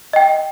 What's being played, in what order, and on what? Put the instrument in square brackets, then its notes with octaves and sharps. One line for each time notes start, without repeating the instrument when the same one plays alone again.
[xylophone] D#5 G5